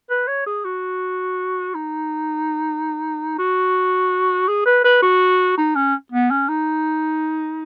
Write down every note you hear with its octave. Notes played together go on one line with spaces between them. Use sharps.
B4
C#5
G#4
F#4
D#4
F#4
G#4
B4
B4
F#4
D#4
C#4
B3
C#4
D#4